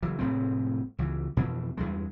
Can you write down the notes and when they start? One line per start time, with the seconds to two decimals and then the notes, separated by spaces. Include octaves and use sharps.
0.03 F#1 E3
0.19 F1 A2 G#3 C4
0.98 C#2 E3
1.37 F2 B2 E3
1.77 E2 G2 G#3